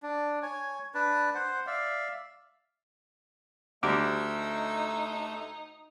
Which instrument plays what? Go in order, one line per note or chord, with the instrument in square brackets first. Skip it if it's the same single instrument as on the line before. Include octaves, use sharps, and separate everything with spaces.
[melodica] D4
C#5 G#5
D4 B4 A5
C5 F#5
D5 E5 F5
[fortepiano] D2 [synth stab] G3 D6 [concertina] A3 E6 [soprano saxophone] D#4